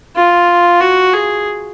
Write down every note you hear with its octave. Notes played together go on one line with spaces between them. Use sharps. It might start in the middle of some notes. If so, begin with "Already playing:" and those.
F4
F#4
G#4